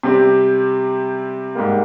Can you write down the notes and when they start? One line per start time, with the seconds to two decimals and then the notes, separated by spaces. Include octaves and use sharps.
0.03 C3 G3 C4 G4
1.55 G#2 G3 A#3